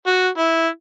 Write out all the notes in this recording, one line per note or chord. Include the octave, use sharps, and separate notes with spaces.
F#4
E4